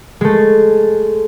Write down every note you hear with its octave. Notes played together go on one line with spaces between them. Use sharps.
G#3 A3